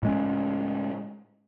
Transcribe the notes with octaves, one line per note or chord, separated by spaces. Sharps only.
A2 G#3 C#4